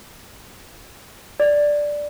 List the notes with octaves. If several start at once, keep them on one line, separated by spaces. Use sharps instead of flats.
D5